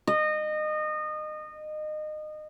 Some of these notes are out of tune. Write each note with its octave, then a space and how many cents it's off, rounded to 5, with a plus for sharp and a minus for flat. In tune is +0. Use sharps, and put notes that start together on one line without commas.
D#5 -25